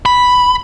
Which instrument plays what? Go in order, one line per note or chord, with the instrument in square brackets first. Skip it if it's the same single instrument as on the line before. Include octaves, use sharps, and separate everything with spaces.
[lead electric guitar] B5